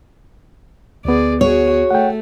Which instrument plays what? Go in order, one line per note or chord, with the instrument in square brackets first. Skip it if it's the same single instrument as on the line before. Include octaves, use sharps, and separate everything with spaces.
[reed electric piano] D2 B3 [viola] G#4 D5
[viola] F#4 G#4 [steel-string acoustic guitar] C#5
[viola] A3 [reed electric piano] F#5 G5